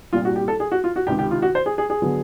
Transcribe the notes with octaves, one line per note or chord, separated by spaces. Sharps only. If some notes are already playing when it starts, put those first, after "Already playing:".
C2 A#2 G3 F4
F#4
G4
A4
G#4
F#4
F4
F#4
C#2 C3 D#3 G4
G4
F4
F#4
C5
G#4
G#4
G#4
D3 F#3 B3